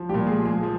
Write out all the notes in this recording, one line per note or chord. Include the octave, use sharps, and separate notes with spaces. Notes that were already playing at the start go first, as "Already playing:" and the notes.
Already playing: F3
G3 G4
A#2
G#3 G#4
F3
G#3 G#4
F3